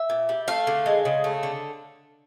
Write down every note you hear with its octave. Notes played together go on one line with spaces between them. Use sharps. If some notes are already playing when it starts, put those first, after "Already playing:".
Already playing: E5
A#2
G3
A3 F5
D3
G#3
C#3
A3
D3